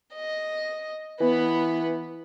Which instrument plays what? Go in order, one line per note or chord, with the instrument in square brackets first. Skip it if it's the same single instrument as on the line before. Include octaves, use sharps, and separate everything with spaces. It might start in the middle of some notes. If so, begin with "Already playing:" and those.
[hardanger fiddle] D#5
[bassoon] E3 [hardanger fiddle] B3 B4